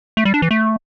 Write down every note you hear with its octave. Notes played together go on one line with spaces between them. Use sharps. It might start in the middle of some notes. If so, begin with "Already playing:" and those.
A3
G3
D4
E3
A3